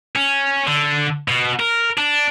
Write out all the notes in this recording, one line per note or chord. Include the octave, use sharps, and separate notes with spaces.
C#4
D3
B2
A#4
D4